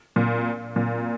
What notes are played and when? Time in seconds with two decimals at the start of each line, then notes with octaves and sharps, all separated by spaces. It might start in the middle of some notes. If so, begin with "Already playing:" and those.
0.16 A#2
0.76 A#2